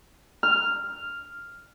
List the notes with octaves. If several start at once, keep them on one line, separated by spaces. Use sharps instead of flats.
F6